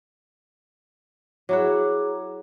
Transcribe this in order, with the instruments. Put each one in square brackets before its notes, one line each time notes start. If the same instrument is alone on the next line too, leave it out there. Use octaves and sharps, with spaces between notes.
[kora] F#3 E4 F#5 [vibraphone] G#4 A#5 D6